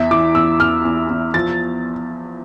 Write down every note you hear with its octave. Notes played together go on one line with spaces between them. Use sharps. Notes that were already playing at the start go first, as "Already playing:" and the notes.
Already playing: E2 E5
E3 D6
E2 E6
E2 F6
E2
E2
F3 A6